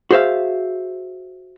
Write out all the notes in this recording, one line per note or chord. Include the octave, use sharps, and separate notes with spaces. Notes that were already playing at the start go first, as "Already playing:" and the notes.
F#4 G#4 C5 E5 F5